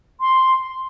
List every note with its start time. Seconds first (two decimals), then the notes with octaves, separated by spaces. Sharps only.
0.21 C6